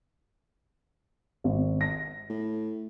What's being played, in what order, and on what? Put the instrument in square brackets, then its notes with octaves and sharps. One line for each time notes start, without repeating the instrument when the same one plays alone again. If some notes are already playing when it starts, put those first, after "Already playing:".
[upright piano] G#1
A#6
[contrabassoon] A2